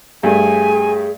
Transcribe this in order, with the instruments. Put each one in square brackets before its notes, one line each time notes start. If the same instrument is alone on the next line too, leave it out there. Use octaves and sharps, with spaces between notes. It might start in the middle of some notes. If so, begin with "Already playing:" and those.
[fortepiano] G2 A3 [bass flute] G#4 [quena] G#5